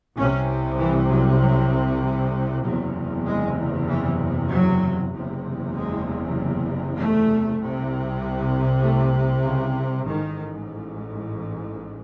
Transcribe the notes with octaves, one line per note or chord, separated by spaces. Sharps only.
C2 C3 C#4
E3
F#3
F#3
E3
F#1 E2 C3 F#3
G#3
E3
F#3
F#1 E2 C3
G#3
A3
C2 C3
A3
C#3
A1 G#2 D#3